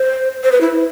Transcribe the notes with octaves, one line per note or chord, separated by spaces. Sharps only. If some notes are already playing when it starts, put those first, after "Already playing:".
Already playing: C5
C5
B4
E4